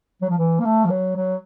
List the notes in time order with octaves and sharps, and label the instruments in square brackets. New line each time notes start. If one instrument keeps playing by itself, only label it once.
[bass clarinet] F#3
F3
E3
A#3
A3
F3
F#3
F#3